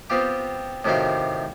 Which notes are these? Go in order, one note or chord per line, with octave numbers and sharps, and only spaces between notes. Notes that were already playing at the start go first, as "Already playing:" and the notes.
B3 C4 F4 G4
A2 C3 D#3 F#4 G4 F5